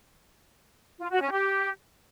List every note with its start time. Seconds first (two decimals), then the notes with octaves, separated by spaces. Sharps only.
1.00 F4
1.10 F#4
1.21 C#4
1.31 G4